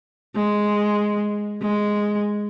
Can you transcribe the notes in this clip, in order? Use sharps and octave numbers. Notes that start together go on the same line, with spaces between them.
G#3
G#3